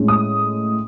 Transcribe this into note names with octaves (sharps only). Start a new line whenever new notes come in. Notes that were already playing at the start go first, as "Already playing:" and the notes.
Already playing: A2 G#3 C#4
D#6